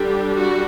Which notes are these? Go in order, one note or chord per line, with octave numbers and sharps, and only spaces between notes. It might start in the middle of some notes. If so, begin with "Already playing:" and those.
Already playing: D3 G3 D4 G4
F#4